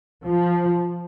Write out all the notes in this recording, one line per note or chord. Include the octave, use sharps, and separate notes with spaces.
F3